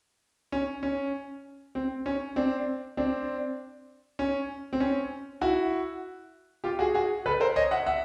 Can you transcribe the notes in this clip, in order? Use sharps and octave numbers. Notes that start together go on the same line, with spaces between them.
C#4
C#4
C4
C#4
C4 D4
C4 D4
C#4
C4
C#4
E4 F#4
F4 G4
F#4 G#4
F#4 G#4
A4 B4
A#4 C5
C#5 D#5
E5 F#5
E5 F#5